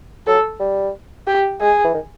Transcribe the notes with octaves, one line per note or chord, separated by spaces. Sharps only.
F#3 A4
G3
G4
G#3 G#4
E3
D#3